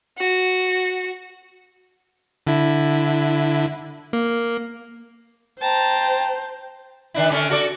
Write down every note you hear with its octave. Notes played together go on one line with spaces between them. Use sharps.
F#4
D3 E4
A#3
C5 G5 A5 A#5
D#3 D4 E4
D3 C#4 A4
F#4 A4 D5